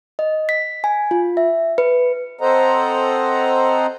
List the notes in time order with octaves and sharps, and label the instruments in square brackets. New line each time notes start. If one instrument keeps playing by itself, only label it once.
[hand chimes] D#5
B6
G#5
F4
E5
B4
[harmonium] C4 A4 C5 D#5 F#5 A#5